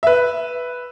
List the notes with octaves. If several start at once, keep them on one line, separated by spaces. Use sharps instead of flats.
B4 E5